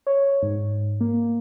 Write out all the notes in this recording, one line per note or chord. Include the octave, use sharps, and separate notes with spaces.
C#5
G#2
A#3